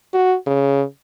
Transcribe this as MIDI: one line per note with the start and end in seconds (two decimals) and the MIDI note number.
0.13 0.36 66
0.47 0.83 49